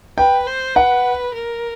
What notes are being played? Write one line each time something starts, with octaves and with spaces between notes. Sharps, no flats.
B4 G5
C5
B4 F#5
A#4